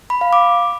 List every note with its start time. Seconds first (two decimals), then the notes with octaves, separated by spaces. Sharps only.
0.10 B5
0.21 F5
0.33 D6